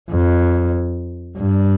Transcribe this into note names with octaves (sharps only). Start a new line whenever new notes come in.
F2
G2